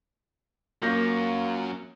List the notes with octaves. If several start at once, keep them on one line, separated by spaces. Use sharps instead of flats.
F#3 A#3 C#4 F4 G6 A#6